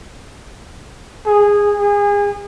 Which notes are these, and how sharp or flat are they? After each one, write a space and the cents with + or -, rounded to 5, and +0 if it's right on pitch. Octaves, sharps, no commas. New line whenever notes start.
G#4 -15
G#4 -30